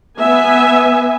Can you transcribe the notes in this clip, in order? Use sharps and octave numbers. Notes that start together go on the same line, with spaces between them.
B3 E5 G#5